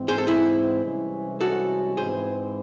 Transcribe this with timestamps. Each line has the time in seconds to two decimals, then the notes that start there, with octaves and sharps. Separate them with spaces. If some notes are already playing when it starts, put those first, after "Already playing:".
Already playing: G#2 E3 C4
0.08 G#4 C5
0.18 A4
0.27 E4 G#4
0.84 C2 C3 E3 G#3 C#4
1.41 F#4 A4
1.97 G#2 E3 C4 G#4 C5